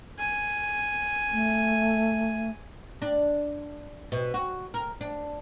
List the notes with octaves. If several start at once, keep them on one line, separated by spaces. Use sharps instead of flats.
G#5
A3
D4
B2
F#4
A#4
D4